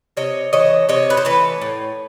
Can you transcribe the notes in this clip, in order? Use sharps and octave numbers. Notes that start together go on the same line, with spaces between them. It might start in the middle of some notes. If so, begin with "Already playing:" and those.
C3 C#5 D#5
E3 A3 C#5 D#5
C3 C#5 D#5
B4
C5
E3 A3 B4 C#5
A2